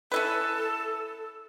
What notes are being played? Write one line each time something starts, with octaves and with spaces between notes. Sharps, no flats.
C#4 E4 A4 B4